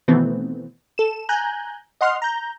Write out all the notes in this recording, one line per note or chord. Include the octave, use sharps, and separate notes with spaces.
B2 D#3 E3 A3 B3 C4
A4 E7
G#5 A#5 F#6 G6
D#5 F#5 C6 F6
A#5 G6